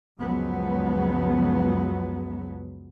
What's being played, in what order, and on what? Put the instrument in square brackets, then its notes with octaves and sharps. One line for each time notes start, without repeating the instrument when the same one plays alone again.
[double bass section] C#2 F#2 F3 F#3 G#3 B3